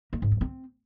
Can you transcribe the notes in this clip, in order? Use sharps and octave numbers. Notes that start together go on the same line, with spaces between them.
A#3
G#2
G2
C4